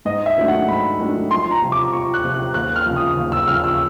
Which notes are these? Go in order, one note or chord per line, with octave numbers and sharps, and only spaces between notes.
G#2 D#5
E5
D#3 F#3 A3 D4
F#5
G#2 B5
D#3 F#3 A3 D4
F2 C6
A#5
C3 F3
D6
F2 C#6
F#6
C3 F3
F#6
D#2 F#6
F6
C#3 F3
D#6
D#2
E6
C#3 F3 F6
E6